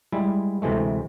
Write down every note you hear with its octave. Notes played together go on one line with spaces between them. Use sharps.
G3 G#3 E4
D2 C3 E3 G#3 A3